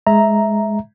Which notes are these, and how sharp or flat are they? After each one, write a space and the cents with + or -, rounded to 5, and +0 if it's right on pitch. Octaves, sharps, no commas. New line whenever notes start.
G#3 +10 E5 +0 A#5 +0